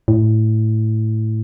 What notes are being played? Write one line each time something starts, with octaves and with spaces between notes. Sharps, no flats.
A2